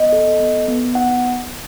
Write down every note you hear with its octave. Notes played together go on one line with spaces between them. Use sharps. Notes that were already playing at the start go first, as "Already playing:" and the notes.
Already playing: B3 D#5
A4
B3
B3
D#4 F#5